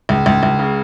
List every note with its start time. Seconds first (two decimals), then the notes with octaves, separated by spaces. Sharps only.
0.09 C#2
0.26 C#2
0.43 C#2
0.59 C#3